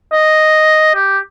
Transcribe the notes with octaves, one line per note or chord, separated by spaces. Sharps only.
D#5
G4